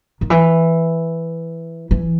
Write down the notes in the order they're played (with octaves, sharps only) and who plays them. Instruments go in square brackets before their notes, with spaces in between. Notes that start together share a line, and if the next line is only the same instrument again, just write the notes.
[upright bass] D#3
E3
E3